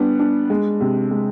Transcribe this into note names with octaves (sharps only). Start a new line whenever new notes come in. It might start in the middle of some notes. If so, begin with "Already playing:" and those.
Already playing: G3 B3 D4
D4
G#3
C3
G#3